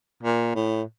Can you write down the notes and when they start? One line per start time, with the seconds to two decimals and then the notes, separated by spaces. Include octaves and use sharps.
0.23 A#2
0.55 A2